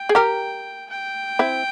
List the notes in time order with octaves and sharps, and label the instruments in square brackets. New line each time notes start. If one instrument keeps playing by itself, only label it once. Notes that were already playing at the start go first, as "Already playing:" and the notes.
Already playing: [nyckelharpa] G5
[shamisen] G#4
G4 A#4
[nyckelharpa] G5
[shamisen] C4 E4